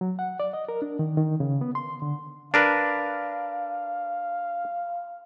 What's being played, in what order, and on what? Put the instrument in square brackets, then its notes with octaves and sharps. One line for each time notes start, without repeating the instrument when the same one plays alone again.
[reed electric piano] F#3
F#5
D5
D#5
A#4
D4
D#3
D#3
C#3
B3
C6
D3
[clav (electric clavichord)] D4 A#4 B4 [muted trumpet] F5